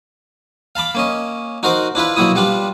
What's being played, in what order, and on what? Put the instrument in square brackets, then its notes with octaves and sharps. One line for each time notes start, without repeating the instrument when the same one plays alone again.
[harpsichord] F5 A5 B5 D6
A#3 C#4 D#5
D#4 F#4 A#4 C5 F#5 D6
D4 E4 F4 B4
B2 F#3 A#3 E4 D#6
G3 B3 D4 F4